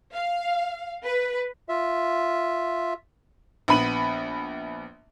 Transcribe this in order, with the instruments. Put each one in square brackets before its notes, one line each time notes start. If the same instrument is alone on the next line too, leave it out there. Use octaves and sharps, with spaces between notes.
[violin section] F5
B4
[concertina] F4 E5
[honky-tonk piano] A#1 B3 B5 D#7 F#7